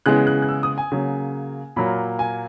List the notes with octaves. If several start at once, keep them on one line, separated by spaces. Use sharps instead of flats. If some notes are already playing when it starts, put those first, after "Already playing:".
C#3 E3 G#3 B3 F#6
F#6
F#6
E6
D#6
G#5
C#3 F#3 A#3
A#2 F#3 A#3 B5
G#5